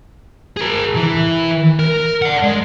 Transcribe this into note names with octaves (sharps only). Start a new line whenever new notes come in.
G#4 A#4
E3
A#4
D5 F#5
G#3